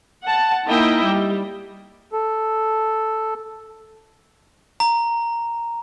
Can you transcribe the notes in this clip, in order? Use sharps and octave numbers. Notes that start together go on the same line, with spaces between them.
F#5 A5
A#3 D#4 E4 D#5 E5 G5
G3
A4
A#5